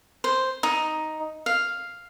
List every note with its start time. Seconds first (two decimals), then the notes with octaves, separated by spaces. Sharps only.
0.24 C5
0.63 D#4
1.46 F5